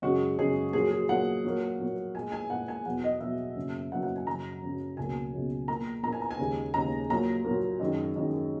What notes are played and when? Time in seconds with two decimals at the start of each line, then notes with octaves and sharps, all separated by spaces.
0.02 F#2 C#3 G#3 F#4
0.38 F#2 C#3 G#3 G#4
0.73 A#2 F#3 A#3 G#4
0.91 G#4
1.09 A#2 F#3 A#3 F#5
1.45 A#2 F#3 A#3
1.79 A#2 F#3 A#3
2.15 A#2 G#3 G#5
2.32 G#5
2.50 A#2 G#3 F#5
2.68 G#5
2.85 E2 B2 F#3 F#5
3.04 D#5
3.20 E2 B2 F#3 E5
3.56 F#2 C#3 F#3 A#3
3.92 F#2 C#3 F#3 A#3 F#5
4.03 F#5
4.16 G#5
4.27 F#2 C#3 F#3 A#5
4.63 F#2 C#3 F#3
4.97 C#2 B2 F#3 A#3 G#5
5.33 C#2 B2 F#3 A#3
5.68 A#2 A#3 A#5
6.03 A#2 A#3 A#5
6.13 G#5
6.21 A#5
6.31 G#5
6.39 D#2 C#3 G#3
6.74 D#2 C#3 G#3 A#5
7.10 A#2 F#3 A#3 A#5
7.44 A#2 F#3 A#3
7.80 F#2 D#3 G#3
8.16 F#2 D#3 G#3